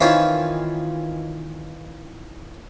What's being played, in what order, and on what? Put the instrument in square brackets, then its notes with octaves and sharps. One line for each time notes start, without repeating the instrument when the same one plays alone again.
[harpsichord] D#3 E3 C4 C#4 E4 F4